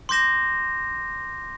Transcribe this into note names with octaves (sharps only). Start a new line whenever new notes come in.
C6 D6 G6 A#6 E7